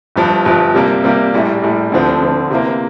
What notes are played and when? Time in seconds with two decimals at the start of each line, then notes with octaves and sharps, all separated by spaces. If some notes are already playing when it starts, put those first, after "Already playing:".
0.16 G1 G2 F3
0.45 G1 G2 F3
0.74 C3 G3 A#3
1.04 C3 G3 A#3
1.34 A#1 A2 G3
1.63 A#1 A2 G3
1.92 D2 D3 F3 C4
2.21 D2 D3 F3 C4
2.50 C3 E3 A#3